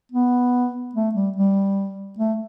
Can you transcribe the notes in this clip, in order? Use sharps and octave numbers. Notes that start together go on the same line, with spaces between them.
B3
A3
G3
G3
A3